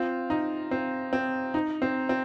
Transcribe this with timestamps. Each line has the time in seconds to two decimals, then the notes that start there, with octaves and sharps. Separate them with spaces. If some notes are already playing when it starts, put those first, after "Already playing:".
Already playing: C4 F4
0.30 D#4
0.71 C4
1.13 C4
1.54 D#4
1.82 C4
2.09 C4